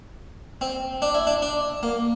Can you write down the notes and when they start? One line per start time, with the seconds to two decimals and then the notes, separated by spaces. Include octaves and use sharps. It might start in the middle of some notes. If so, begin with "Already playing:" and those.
0.61 C4
1.02 D4
1.14 E4
1.27 D4
1.42 D4
1.83 A#3